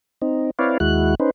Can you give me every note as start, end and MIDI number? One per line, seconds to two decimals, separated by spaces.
0.22 0.51 60
0.22 0.51 63
0.59 0.78 60
0.59 0.78 64
0.59 0.78 71
0.59 0.78 73
0.59 0.78 74
0.59 0.78 77
0.80 1.15 39
0.80 1.15 56
0.80 1.15 64
0.80 1.15 66
0.80 1.15 90
1.20 1.31 61
1.20 1.31 63
1.20 1.31 71
1.20 1.31 72